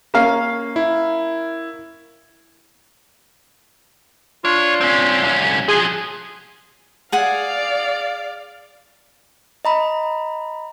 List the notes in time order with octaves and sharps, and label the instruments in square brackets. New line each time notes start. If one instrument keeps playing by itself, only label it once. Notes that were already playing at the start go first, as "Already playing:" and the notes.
[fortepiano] A#3 C#4 F5
[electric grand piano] E4
[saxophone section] D4 F4 [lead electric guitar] C#5
[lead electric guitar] C4 C#4
C2 C#4
[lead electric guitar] F3 F#3 [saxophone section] G#4
[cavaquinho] G#4 F#5 G#5 [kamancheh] D5 F5
[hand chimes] D#5 A#5 B5